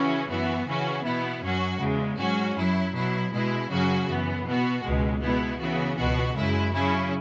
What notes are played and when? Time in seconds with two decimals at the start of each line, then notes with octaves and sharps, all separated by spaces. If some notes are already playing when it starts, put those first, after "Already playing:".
Already playing: C#3 E3 C#4 F#4
0.29 F#2 E3 B3 F#4
0.66 C#3 E3 C#4 F#4
1.04 B2 B3 E4
1.42 F#2 F#3 C#4 F#4
1.80 E2 C#3 G#3
2.18 G#2 F#3 C#4 F#4
2.56 F#2 F#3 E4
2.93 B2 F#3 E4
3.32 B2 G#3 E4
3.70 F#2 C#3 F#3 C#4 F#4
4.08 F#2 E3 B3
4.45 B2 B3 F#4
4.83 C#2 B2 G#3
5.22 B2 G#3 B3 E4
5.59 C#3 E3 B3 F#4
5.97 C#2 B2 B3 F#4
6.35 F#2 C#3 G#3 E4
6.73 C#3 F#3 C#4 E4